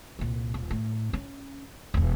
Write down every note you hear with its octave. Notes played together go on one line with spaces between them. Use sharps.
C2 A#2
D#1
A2
C#4
E1 E2